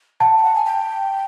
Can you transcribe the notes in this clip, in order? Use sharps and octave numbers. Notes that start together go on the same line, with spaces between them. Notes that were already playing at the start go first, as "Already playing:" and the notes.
F#5 A5
G5
F#5
G#5
G5